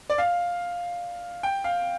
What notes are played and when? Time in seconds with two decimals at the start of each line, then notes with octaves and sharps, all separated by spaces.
0.10 D5
0.18 F5
1.43 G5
1.64 F5